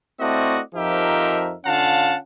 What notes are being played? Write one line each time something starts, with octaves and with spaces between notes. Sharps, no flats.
A3 C4 E4 F#4 D5 D#5
F2 F3 D#4 G4 A#4 E5
D3 C#4 F4 F5 F#5 A5